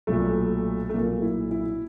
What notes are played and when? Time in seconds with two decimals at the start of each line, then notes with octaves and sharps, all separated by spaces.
0.07 B1 A#2 A3
0.89 A3
0.94 B1 A#2 A#3
1.22 E4
1.51 E4